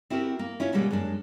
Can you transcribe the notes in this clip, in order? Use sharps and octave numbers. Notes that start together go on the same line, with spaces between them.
C4 E4 F#4 G4 A#4
A#3
C#4 E4 F4 C#5
B2 D3 E3 G3 G#3 A#3
F#2 G#3 C#4 D4